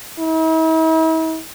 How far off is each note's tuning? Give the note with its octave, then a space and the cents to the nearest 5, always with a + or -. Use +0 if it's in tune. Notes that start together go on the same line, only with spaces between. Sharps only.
E4 -45